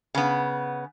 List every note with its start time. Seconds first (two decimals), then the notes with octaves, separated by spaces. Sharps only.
0.15 C#3 B3